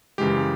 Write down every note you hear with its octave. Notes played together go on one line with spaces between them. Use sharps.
F#2 C#3 E3 G#3 G4